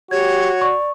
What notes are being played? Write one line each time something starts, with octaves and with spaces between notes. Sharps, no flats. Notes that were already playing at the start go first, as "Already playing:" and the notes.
F#4 G4 C#5 G#6
D5 C#6